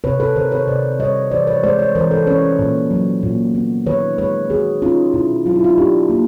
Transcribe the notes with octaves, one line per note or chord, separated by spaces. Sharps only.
C3 B4 C#5
A4 B4
D#3 A#4 C5
B4 C#5
C3 C5 D5
G3 C#5 D#5
E3 C5 D5
B4 C#5
G#3 C5 D5
B4 C#5
E3 A#4 C5
A4 B4
C#4 B4 C#5
A#2
F#3
A#2
B3
D#3 B4 C#5
G#3 B4 C#5
D#3 F#4 G#4
C#4 D#4 F4
B2 E4
F#3 F4
E4
D#4 F4
D4 F4 G4
A#3